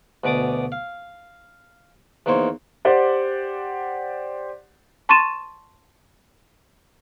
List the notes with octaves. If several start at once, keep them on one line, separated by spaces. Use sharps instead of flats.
D2 B2 D5 D6 D#6
F5
E2 D#3 A#3 C5 C#5
G4 C5 D5 F#5
A5 C6 C#6 A6 D#7 E7